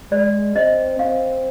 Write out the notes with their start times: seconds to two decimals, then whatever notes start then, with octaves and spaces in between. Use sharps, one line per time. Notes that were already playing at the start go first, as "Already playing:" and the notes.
0.11 G#3 D5
0.56 C4 D#5
0.99 C4 F5